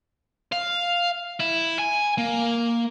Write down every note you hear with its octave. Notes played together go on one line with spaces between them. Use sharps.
F5
E4
G#5
A#3